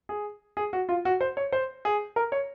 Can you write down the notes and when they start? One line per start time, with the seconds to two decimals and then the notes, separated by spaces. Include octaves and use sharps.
0.09 G#4
0.57 G#4
0.73 F#4
0.89 F4
1.05 F#4
1.21 C5
1.37 C#5
1.52 C5
1.85 G#4
2.16 A#4
2.32 C#5